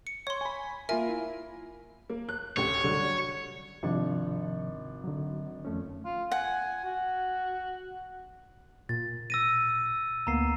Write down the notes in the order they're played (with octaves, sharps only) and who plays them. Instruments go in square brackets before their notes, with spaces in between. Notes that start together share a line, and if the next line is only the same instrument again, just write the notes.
[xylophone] C#7
[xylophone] C#5 C6 [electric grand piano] C#6
[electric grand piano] G#5 B5
[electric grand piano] A#3 F4 A#4 [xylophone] E5 G#5
[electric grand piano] E4
[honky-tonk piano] A#3
F#6
[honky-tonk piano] A1 D2 G4 [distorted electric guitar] C#5
[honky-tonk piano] D3 F#3 G3
[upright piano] G#1 D4 [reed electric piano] C3 F3
[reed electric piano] D3 F#3
F2 A3 C#4
[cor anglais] F4
[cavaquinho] F#5 [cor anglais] G#5
[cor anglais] F#4
[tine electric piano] A#2 [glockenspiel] A6
[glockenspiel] E6 A#6 D#7
[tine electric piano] D2 A#3 B3 [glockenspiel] A#5 C7